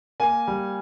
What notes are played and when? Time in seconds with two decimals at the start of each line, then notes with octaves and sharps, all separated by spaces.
0.20 A#3 G#5
0.47 G3